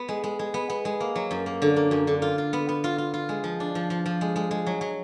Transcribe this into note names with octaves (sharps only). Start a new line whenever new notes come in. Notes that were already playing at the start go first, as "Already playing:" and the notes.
Already playing: B3
G#3
G#3
G#3
B3
B3
G#3
A#3
F#3
F#2
A#3
D3
A#3
F#2
D3
F4
F4
B3
B3
F4
F4
F4
G#3
F3
D4
F3
F3
F3
G#3
G#3
G#3
F#3
F#3